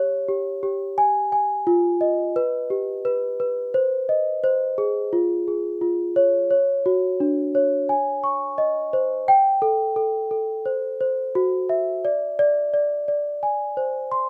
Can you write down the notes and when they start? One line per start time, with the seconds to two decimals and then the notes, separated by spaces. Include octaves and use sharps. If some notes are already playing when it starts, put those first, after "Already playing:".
Already playing: G4 C#5
0.28 G4
0.63 G4
0.98 G#5
1.32 G#5
1.67 F4
2.01 D#5
2.36 B4
2.70 G4
3.05 B4
3.40 B4
3.74 C5
4.09 D#5
4.44 C5
4.78 G#4
5.13 F4
5.48 G#4
5.81 F4
6.16 C#5
6.51 C#5
6.86 F#4
7.20 D4
7.55 C#5
7.89 G#5
8.24 C#6
8.58 D#5
8.93 C5
9.28 G5
9.62 A4
9.96 A4
10.31 A4
10.66 C5
11.01 C5
11.35 F#4
11.69 E5
12.05 D5
12.39 D5
12.74 D5
13.08 D5
13.43 G#5
13.77 C5
14.12 C6